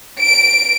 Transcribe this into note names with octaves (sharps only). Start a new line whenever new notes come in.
D7